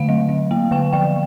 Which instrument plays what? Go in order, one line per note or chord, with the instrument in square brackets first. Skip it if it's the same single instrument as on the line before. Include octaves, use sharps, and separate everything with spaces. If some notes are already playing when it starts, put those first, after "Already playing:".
Already playing: [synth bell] D3 A3 F5
F#3
F#3
A#3
D3 G5
F3 G5